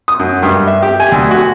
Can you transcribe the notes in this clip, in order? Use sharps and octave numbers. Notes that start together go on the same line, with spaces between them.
D#6
F#2
G2
E5
G4
G#5
D2
F#4